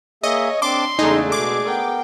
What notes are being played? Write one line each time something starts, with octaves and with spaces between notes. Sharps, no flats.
A#3 G#4 C#5 D#5 E5
C4 D4 A5 C6 D6
E2 C#3 G#3 A3 D4 D#4 G#5
B2 G#4 D6
B3 A#4 G5